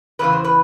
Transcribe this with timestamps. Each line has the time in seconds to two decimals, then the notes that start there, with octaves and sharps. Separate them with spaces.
0.19 E2 C#3 E3 B4
0.33 C5
0.44 B4